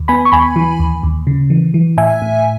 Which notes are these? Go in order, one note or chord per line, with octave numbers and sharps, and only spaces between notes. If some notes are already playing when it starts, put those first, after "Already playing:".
Already playing: D#2
B3 G#5 B5
C#6
D#2 G#5 B5
E3
D#2
D#2
C#3
E3
E3
A2 E5 G#5
A2